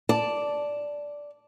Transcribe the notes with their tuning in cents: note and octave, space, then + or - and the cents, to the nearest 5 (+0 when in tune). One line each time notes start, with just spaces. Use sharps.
D5 -5 A5 +0